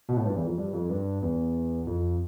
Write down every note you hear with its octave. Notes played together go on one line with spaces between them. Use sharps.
B2
A2
G2
E2
F2
G2
F2
G2
E2
F2